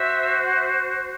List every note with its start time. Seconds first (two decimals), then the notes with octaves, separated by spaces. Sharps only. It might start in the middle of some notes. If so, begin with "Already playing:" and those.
Already playing: F#4 C5 E5
0.45 F#5
0.57 E5